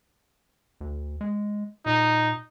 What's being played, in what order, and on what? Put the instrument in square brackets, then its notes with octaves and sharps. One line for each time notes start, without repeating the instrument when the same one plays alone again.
[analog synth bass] D2
G#3
[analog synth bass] A#2 [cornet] D#4